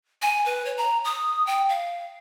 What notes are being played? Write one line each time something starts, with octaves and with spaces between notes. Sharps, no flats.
G#5
B4
C#5
A#5
D#6
G5
F5